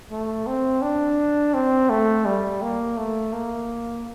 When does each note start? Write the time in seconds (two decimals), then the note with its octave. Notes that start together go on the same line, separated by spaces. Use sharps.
0.11 A3
0.47 C4
0.82 D4
1.54 C4
1.90 A3
2.25 G3
2.62 A#3
2.98 A3
3.33 A#3